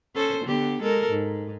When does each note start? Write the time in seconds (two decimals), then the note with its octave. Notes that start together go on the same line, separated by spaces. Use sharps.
0.15 C#4 A4 C5
0.45 D3 B3 G4
0.81 G#3 A4 A#4
1.10 G#2